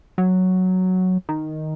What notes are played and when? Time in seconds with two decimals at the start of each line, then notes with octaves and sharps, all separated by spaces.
0.18 F#3
1.29 D#3